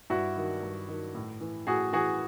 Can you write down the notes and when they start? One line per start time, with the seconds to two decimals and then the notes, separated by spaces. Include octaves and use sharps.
0.10 G2 E4 F#4
0.36 D#3 F#3
0.63 G2
0.88 D#3 F#3
1.15 A2
1.41 E3
1.67 A2 F#4 G#4
1.93 E3 F#4 G#4